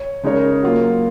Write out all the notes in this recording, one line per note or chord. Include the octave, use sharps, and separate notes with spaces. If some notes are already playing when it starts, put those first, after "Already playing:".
Already playing: C#5
C#3 G#3 D#4 A#4 C#5
F#3 A#3 F4